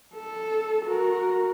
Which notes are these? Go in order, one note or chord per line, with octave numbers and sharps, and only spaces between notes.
A4
F#4 A#4